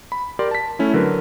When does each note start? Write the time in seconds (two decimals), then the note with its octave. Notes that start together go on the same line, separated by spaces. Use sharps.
0.12 B5
0.39 G4 A#4 D5 C6
0.51 A5 B6
0.79 A3 C#4 E4
0.94 D3 F#3 A#4 B4